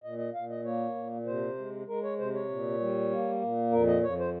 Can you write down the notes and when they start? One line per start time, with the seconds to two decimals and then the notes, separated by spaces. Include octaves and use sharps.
0.04 A#2 D#5
0.19 D#5
0.34 A#2 F5
0.50 D#5
0.64 A#3 C#5
0.96 A#2
1.26 C3 C5
1.58 G#3
1.88 G#3 A#4
2.03 C#5
2.19 C3 C5
2.34 C#5
2.49 A#2
2.80 G3
3.11 A#3
3.42 A#2
3.72 F2 A#4
3.87 D#5
4.03 F2 C#5
4.19 C5